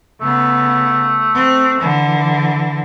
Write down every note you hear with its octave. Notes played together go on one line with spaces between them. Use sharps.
C#3 A3 B3
C4
D3 E3